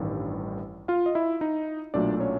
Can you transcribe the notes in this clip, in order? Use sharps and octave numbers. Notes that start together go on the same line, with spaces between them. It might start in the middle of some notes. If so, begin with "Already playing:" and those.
Already playing: A1 G2 D#3
F4 F5
D#5
E4 E5
D#4 D#5
B1 A#2 F#3 A3 D4 D5
C#4 C#5